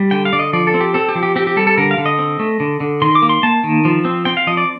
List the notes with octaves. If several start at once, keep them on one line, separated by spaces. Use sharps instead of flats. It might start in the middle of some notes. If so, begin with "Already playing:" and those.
Already playing: G3
D3 G5
F5
D3 D5
D#5
F3 D5
A4
C4
G4
C4 A4
G4
F3
G4
C4 G4
G4
G3 A4
A4
D3 A#4
F5
D3
D#5
C4
A3
D3
D3
D#3 C6
D6
A#3
C6
A#3 A5
D#3
F3
C4
C4 G5
F5
F3 D#5
D5